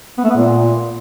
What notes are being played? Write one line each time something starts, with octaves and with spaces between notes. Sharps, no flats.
B3
A3
B3
A#2